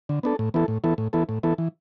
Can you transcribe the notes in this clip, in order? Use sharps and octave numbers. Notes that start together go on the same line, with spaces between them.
D3
B3 D4 A4
A2
E3 B3 E4 A4
A2
E3 B3 E4 A4
A2
E3 B3 E4 A4
A2
E3 B3 E4 A4
E3